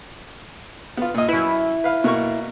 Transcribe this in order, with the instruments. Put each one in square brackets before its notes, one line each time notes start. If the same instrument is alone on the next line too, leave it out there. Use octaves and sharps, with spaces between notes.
[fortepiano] B3 F4
A#2 D#5
[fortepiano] F#2 B4 [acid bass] E4
[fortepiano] B4 F5
B2 A#3 C#6